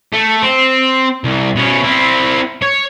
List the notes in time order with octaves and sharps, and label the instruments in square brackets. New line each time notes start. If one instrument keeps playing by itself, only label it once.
[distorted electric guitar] A3
C4
C2
B2 C#4
C4 E4
C#5